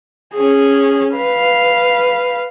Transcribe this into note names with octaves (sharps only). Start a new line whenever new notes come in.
C#4 G#4
B4 F5